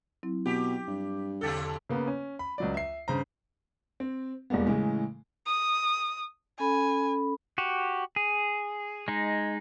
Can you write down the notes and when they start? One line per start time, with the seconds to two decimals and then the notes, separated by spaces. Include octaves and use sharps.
0.23 F#3 C4 E4
0.46 B2 G4
0.88 G2
1.41 E2 B2 D3 G4 A4 A6
1.89 C#3 A#3 B3
2.07 C#4
2.39 B5
2.58 C#2 F#3 D5
2.74 E5 C7
3.08 G2 C#3 C5 A#5
4.00 C4
4.50 E1 G3 G#3 A#3 B3
4.67 A2 C#3 E3 G#3
5.47 D#6
6.60 C#4 A4 G#5 B5
7.58 F#4 G4
8.16 G#4
9.08 G#3 D#4